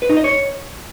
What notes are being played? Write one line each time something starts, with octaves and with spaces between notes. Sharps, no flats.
B4
D#4
D#5
C#5